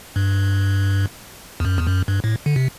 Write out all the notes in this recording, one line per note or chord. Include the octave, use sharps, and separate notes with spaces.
G2
E2
F#2
E2
F#2
G2
A2
D3
C3